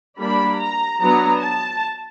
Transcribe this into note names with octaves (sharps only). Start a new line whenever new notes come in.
G3 A#3 D4 B5
A#5
F#3 B3 D4 A#5
A5